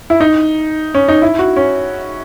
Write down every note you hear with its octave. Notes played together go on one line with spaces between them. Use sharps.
E4
D#4
C#4
D#4
E4
F#4
C#4